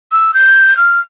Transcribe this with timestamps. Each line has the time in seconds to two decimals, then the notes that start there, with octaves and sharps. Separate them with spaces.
0.12 E6
0.34 G6
0.77 F6